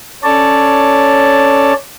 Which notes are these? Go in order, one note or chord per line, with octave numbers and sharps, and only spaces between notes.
C#4 A4 C#5 D5 A5